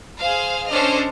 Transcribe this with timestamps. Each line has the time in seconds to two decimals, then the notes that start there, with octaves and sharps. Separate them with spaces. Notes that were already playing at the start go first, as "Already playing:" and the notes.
0.18 G#4 C5 F5
0.70 C#4 D4 A4 C5 D#5 F6